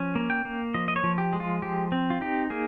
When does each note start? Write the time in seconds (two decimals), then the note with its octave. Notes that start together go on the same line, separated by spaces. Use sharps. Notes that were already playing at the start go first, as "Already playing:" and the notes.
Already playing: F3 C#4
0.15 A#3
0.30 G5
0.45 A#3
0.74 F3 D#5
0.88 D#5
0.96 C#5
1.04 F3
1.18 G4
1.33 G#3
1.40 F4
1.62 F3 G4
1.92 C4
2.10 F4
2.21 D#4 G4
2.50 A#3 G#4